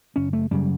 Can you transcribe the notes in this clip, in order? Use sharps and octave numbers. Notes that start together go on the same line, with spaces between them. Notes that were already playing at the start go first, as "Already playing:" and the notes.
F#1 C#4
A3
F#2 C#3 G3